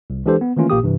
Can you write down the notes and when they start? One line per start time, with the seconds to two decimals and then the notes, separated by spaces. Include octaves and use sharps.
0.10 C2
0.26 E3 G#3 D4 G4 A4 C5
0.41 B3
0.57 D#3 E3 A3 A#3 C#4 F4
0.70 A1 A#2 A#3 G4 D#6
0.83 G2 C3 E3